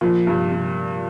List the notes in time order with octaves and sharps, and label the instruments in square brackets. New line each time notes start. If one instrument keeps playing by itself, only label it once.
[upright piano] A#2 [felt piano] F3
[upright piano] G2 [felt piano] C3
[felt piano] C3